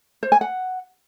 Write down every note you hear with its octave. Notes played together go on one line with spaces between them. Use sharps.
C5
G#5
F#5